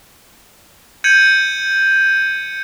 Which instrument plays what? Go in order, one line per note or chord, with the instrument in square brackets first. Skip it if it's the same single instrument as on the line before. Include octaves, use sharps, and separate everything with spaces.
[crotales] G6 G#6 C#7 D#7 F#7